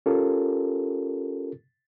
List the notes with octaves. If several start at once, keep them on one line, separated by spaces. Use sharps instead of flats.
C#4 F4 G4 A4 A#4